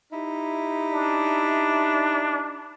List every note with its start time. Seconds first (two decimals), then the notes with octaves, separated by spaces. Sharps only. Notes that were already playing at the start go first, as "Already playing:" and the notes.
0.12 D#4 E4 G4
0.93 D4